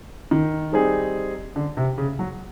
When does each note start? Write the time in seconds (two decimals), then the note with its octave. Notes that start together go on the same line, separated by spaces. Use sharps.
0.31 D#3
0.73 G3 C4 D#4 G#4
1.56 D3
1.77 C3
1.98 C#3
2.19 F#3